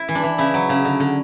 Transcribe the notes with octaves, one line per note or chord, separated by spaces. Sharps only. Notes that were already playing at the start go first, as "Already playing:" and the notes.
Already playing: E4
E3
D4
E3
C#3 E4
F#3
C#3
D3
D3